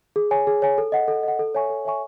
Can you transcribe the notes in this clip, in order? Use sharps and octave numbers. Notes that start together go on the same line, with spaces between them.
G#4
C#5 G#5
G#4
C#5 G#5
A4
D#5 F#5
A4
D#5 F#5
A4
C#5 E5 G#5 C#6
A4
C#5 E5 G#5 C#6